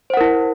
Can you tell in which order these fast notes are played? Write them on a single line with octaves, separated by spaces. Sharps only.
C5 F#5 A#4 E4